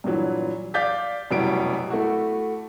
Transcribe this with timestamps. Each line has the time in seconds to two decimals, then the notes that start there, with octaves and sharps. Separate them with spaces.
0.04 G2 A#2 E3 F#3
0.74 D5 F5 D6 G6 A6 B6
1.31 F1 F#2 B2 G3 E4 D7
1.90 A3 E4 F#4